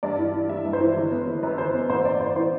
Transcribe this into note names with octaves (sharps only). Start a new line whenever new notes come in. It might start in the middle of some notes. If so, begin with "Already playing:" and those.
G2 D5
E3
E3
G2 E5
G2
C5
E3
G1
B3
G1
F#2 B4
G1 C5
B3 B4
A1 C5
A1 D5
A1 C5
E3 C5